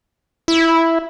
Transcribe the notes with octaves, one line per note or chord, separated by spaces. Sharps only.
E4